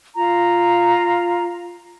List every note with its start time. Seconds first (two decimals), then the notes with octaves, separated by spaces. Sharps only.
0.15 F4 A#5